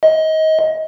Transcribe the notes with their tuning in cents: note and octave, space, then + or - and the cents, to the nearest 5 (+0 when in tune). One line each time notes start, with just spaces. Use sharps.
D#5 +25